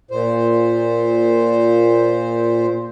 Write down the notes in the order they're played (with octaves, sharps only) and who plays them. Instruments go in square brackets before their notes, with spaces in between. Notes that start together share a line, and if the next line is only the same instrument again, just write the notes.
[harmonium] A#2 C5